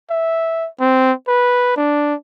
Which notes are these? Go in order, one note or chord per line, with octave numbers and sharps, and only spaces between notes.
E5
C4
B4
D4